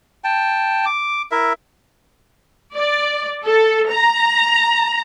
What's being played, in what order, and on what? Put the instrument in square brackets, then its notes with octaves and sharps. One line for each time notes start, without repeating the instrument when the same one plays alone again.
[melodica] G5 A5
D6
E4 A#4 E5
[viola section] D5
A4
A#5